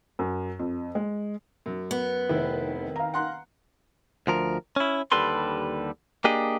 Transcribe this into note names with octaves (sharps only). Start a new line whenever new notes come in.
F#2
F2
G#3
F#2
B3
F1 C3 D#3 E4
F5 A#5
F#5 C6 F#6
D2 F3 A#4
C#4 E4
D#2 D3 G3 A4 B4 C6
A#3 D4 G4 G#4 D#5